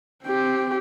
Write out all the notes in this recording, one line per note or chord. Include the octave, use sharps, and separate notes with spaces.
C4 G4